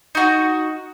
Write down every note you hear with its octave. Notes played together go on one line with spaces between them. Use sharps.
D#4 F#4